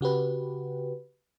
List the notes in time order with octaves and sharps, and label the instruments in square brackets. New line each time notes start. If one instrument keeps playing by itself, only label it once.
[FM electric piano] C#3 F#4 G4 B4